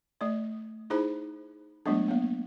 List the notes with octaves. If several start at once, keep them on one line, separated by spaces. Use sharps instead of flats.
A3 D5
D#4 E4 G#4 C5 B5
F#3 G#3 A3 B3 D4
A#3 B3